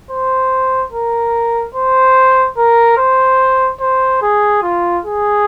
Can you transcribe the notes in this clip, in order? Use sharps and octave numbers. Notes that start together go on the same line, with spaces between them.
C5
A#4
C5
A#4
C5
C5
G#4
F4
G#4